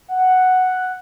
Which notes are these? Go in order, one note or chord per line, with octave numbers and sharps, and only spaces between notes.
F#5